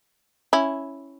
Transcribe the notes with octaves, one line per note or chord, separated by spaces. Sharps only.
C#4 E4